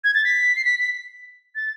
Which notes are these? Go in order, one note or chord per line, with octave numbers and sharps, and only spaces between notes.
G#6
A6
B6
C7
B6
B6
A6